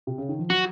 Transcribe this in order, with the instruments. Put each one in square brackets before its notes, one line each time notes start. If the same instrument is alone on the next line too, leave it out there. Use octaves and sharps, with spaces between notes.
[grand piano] C3
C#3
D#3
F3
[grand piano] F#3 [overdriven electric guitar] F#4